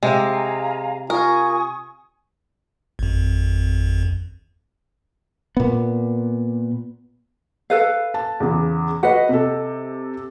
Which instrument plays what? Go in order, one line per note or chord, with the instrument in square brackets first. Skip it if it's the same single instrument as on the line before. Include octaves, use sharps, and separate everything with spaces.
[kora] C3 [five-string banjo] G#3 [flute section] F5 G#5 A#5
[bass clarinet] F4 [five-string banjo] A#4 [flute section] G#5 C#6 D#6
[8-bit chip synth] G#1 F2
[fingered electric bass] A#2 B3
[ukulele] A4 B4 F5
[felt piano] A5
E2 C#3
[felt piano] F#4 B4 [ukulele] D#5 F#5
[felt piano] C3 A4